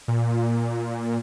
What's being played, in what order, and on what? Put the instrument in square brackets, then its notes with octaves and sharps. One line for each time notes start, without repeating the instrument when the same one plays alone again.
[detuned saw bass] A#2